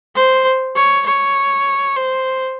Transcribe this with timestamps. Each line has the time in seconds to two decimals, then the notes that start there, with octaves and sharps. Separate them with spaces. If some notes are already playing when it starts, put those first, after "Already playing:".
0.15 C5
0.75 C#5
1.06 C#5
1.96 C5